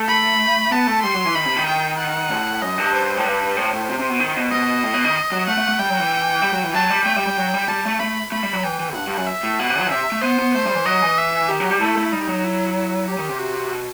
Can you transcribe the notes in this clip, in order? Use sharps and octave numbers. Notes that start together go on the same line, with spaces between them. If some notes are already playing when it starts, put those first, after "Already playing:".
Already playing: A3
B5
B3 A5
A3
G3 C6
F#3
E3
D#3 B5
C3
D#3
G5
F#5
A2
F#2 D#5
G2
C5
A2
G2 B4
A2 C5
A2
C3
C3
B2
D#3
B2
B2 D#5
A2
B2
D#3
F#3
A3 F#5
A3
A3
G3 G5
F#3
E3
G3
F#3
E3
F#3 A5
G3
A3 G5
G3
G3
F#3
G3
G3 A5
A3
A3 B5
A3 B5
G3
F#3
E3 G5
E3
G2 F#5
G2
F#2
E5
A2
B2 F#5
C3
F#3
C3 E5
A3
B3 C5
B3
A3 C5
G3
E3
F#3 D#5
E3
E5
D#3 G4
F#3
G3
A3 E4
A3
G3 D#4
F#3
E4
E4
G4
D#3
C3
F#4
B2